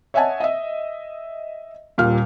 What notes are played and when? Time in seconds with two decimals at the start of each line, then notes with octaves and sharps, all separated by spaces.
0.14 C#5 D#5 E5 F#5 G#5 A5
0.40 D#5 E5
1.98 D#1 A#2 G3 F5 F6